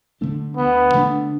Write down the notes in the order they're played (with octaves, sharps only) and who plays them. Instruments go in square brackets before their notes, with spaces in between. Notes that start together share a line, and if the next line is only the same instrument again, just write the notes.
[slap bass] D3 A3 D4
[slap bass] D2 [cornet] B3
[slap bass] D3 A3 D4